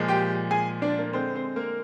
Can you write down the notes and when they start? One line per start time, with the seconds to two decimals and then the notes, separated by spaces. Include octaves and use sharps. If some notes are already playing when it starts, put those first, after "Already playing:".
Already playing: A#2 F3 G#3
0.08 G4 G5
0.51 G#4 G#5
0.82 D4 D5
0.98 A#3 A#4
1.13 D3 G#3 C4 C5
1.34 C4 C5
1.56 A#3 A#4